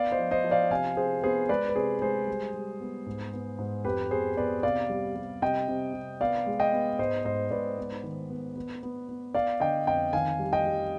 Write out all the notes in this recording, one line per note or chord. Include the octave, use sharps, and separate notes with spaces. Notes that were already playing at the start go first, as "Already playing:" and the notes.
Already playing: B3 D5 F5
C5 D#5
F3
C5 D#5
F3
D5 F5
C3 F5 G#5
C3 G#4 C5
B3 G#4 C5
G#3 B4 D5
B4
C3 G#4 C5
G#3 G#4 C5
G3
G3
B3
G#2
B3
G#2
F2 G4 B4
B3 G#4 C5
B3 B4 D5
C3 D5 F5
G3
G3
C3 D#5 G5
C3
C3
B3 D5 F5
G#3
D#5 G5
B3
G#2 C5 D#5
G#2 C5 D#5
G#2 B4 D5
B3
D#3
B3
B3
B3
B3
B3 D5 F5
D3 D#5 G5
F2 D#5 G5
D#3 F5 G#5
G3
D#5 G5
G3